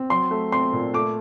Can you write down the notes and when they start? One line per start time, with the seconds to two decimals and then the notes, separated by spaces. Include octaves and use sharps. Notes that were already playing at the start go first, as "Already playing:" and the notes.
Already playing: C4
0.10 F#3 C6
0.31 A3
0.52 C4 C6
0.73 A#2
0.94 A3 D6